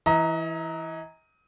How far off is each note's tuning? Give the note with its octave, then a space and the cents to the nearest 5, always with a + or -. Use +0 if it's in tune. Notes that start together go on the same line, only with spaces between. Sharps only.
E3 +0 D#5 +40 A#5 +0